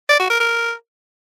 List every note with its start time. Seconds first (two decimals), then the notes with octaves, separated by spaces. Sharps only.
0.09 D5
0.19 F#4
0.30 A#4
0.40 A#4